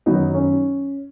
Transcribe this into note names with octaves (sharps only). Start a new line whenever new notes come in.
F#2 D#3 F#3 B3 D#4
C#4